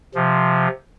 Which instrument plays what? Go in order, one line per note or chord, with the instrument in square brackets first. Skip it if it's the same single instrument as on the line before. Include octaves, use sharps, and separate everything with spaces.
[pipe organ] C3 F3